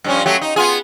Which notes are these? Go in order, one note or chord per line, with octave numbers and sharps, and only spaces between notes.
G2 F3 C#4
F#3 A3 G4
D#4
B3 F4 G#4